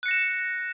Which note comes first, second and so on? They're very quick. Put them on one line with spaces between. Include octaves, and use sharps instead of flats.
F#6 C#7 A#6 E7